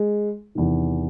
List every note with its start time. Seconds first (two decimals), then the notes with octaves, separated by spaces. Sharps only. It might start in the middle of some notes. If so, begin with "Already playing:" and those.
Already playing: G#3
0.55 E2 C3 D#3